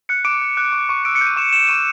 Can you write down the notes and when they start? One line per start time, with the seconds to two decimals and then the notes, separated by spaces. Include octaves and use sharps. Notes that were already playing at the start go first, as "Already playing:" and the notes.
0.09 F#6 C#7
0.25 D6 D7
0.42 F#6
0.57 F#6
0.73 C#6
0.89 C#6
1.05 E6 D7
1.15 C#7
1.21 G6
1.27 D#7
1.36 C#6 E7
1.53 C#6 E7
1.68 C#6 D#7